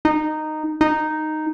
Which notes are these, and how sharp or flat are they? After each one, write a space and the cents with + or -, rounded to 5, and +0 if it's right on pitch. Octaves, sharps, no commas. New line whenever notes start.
D#4 -10
D#4 -5